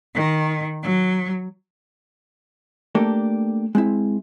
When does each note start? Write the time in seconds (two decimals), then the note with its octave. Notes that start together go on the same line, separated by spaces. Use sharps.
0.13 D#3
0.81 F#3
2.95 A3 A#3 D4 G4 A4 A#4
3.75 G#3 C4 E4